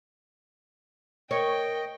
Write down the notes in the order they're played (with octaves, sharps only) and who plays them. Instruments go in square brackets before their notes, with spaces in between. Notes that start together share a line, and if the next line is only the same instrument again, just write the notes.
[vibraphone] A#4 [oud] C#5 [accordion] D#5 [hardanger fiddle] G5